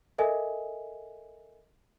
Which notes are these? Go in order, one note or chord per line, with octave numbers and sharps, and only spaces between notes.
A4 A#4 D#5 E5 G#5